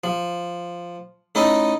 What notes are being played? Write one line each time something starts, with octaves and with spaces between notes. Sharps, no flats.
F3
A3 C#4 D#4 E4 D#5